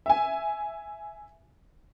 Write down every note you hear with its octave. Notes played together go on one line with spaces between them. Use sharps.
E5 G#5